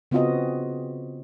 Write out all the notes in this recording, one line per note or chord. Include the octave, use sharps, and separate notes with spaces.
C#3 B3 C4 F4 F#4 D#5